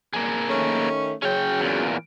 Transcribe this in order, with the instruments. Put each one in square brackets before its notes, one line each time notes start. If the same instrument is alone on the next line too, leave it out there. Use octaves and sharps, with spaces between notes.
[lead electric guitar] A#3 G#4
[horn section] D#3 A3 C#4
[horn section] C#3 F#3 [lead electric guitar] C#4 G5
[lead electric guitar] E2 A#2